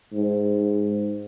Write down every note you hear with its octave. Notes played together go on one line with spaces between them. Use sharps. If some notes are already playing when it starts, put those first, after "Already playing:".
G#2